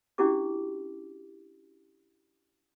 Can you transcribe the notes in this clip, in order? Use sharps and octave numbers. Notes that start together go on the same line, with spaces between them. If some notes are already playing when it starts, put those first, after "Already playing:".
C#4 D4 E4 F#4 G4 D6